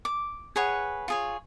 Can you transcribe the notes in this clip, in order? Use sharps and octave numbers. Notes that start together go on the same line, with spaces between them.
D6
G#4 B4 C#5 F#5
F4 G#4 C#5